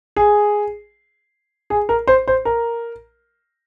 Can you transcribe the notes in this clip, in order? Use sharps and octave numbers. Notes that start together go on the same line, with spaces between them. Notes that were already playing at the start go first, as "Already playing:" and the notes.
G#4
G#4
A#4
C5
C5
A#4